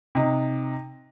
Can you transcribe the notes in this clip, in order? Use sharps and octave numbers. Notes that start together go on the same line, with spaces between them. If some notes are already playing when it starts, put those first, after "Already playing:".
C3 D#4